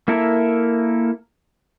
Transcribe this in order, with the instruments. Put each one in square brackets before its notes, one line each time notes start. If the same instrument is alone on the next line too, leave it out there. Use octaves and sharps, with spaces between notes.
[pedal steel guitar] A#3 E4 A4 A#4 E5